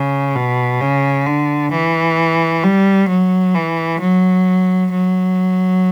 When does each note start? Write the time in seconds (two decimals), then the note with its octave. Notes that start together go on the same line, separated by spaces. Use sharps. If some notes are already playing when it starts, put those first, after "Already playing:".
Already playing: C#3
0.35 B2
0.81 C#3
1.26 D3
1.71 E3
2.64 G3
3.09 F#3
3.55 E3
4.00 F#3
4.92 F#3